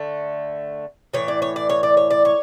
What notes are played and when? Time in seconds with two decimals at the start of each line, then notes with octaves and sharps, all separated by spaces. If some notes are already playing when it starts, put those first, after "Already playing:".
Already playing: D3 A3
1.14 A2 E3 C#5
1.28 D5
1.42 C#5
1.56 D5
1.69 C#5
1.83 D5
1.97 C#5
2.11 D5
2.25 C#5